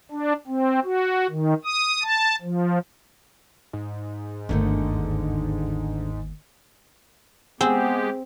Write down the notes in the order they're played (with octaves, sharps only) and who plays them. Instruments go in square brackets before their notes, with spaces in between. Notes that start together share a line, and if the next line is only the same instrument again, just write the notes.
[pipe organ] D4
C4
F#4
D#3
D#6
A5
F3
[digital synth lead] G#2
[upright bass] G1 D#2 [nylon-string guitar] D3 D#3 A3
[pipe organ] G#3 G4 [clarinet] B3 [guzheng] C4 [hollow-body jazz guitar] G#4